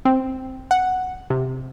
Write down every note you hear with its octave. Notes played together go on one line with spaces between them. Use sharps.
C4
F#5
C3